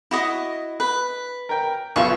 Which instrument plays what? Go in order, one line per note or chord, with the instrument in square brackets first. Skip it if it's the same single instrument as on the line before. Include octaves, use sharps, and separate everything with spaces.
[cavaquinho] E4 F#4 D#5
B4
[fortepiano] A#4 G5
[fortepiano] B1 B2 F4 [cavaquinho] E5 C#6